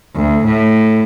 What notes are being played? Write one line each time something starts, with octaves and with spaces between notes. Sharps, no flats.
D2
A2